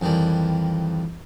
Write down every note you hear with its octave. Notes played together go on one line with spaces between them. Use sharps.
F2 D#3 E3 G3